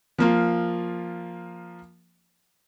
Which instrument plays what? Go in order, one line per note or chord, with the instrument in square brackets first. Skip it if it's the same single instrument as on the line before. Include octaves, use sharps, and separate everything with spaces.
[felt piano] F3 A#3 F4